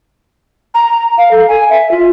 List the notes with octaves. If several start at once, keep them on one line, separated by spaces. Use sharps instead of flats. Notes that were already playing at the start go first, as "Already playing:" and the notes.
A#5
F5
A4
G#5
E5
F4